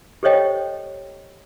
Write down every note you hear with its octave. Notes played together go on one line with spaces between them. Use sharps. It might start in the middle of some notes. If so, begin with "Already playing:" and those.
G4 A4 C5 C#5 D#5 G5